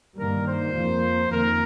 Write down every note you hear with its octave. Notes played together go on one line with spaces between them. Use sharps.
G2 D#3 G3 A#3 A#4
C5
F2 F3 A#3
F2 D#3 A#3 A#4